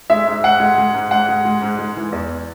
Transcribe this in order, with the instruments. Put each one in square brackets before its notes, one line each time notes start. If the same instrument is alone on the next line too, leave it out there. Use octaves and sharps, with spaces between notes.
[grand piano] G#3 E5
G#2
G#2 F#5
G#3
G#3
G#2
G#2 F#5
G#3
G#3
G#2
G#3
E3
E2